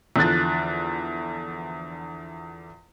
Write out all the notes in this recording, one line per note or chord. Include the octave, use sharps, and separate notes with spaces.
E2 D3 F3 F#6 A6